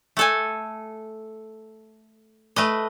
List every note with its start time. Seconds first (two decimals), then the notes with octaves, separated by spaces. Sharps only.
0.17 A3 A4 G#5
2.56 A3 B4 D#5